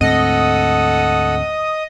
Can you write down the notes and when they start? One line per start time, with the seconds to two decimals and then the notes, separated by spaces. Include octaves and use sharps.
0.01 D2 G#2 C4 A4 D#5 F#5